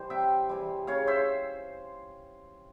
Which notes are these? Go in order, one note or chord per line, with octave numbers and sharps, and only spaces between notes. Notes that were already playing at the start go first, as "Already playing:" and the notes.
Already playing: E3 G3 C5
C3 E5 G5
E3 G3
C#3 C#5 F5
C5 E5